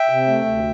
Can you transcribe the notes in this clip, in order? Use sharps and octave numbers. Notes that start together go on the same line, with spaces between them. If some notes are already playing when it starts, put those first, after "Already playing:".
Already playing: E5 G5
C3
A3
D2